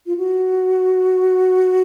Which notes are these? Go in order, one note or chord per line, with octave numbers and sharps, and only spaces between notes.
F4
F#4